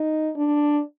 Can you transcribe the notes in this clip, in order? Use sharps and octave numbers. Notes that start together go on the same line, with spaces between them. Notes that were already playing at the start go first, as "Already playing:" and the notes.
Already playing: D#4
D4